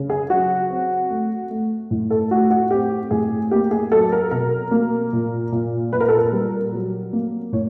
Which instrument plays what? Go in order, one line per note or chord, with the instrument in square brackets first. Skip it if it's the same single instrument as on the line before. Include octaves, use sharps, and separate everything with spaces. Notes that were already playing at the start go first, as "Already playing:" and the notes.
Already playing: [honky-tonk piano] C#3
G#4
F#3 F#4
C4
A3
A3
A2
A4
A3 F#4
F#4
C4 G4
A2 G#4
A#3 G4
G#4
F#3 A4
A#4
B2 A#4
A#3
A#2
A#2
A#2 B4
A#4
A4
A#4
G3
F#3
A#3
A2 C#5